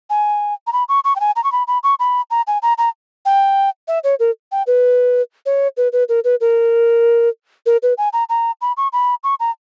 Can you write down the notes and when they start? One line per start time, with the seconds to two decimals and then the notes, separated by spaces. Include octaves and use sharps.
0.10 G#5
0.67 A#5
0.73 B5
0.89 C#6
1.04 C#6
1.16 G5
1.20 G#5
1.36 A#5
1.44 C#6
1.52 B5
1.67 B5
1.83 C#6
1.99 B5
2.31 A#5
2.47 G#5
2.62 A#5
2.78 A#5
3.25 G5
3.88 E5
4.04 C#5
4.20 A#4
4.52 G5
4.67 B4
5.46 C#5
5.77 B4
5.93 B4
6.09 A#4
6.24 B4
6.41 A#4
7.66 A#4
7.83 B4
7.98 G#5
8.13 A#5
8.29 A#5
8.61 B5
8.77 C#6
8.93 B5
9.23 C#6
9.40 A#5